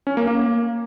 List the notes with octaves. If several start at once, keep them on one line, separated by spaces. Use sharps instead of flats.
C#4
A#3
A#3